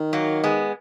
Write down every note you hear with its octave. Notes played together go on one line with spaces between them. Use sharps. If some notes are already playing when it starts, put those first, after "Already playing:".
Already playing: D#3
F#3 A#3
G#3 B3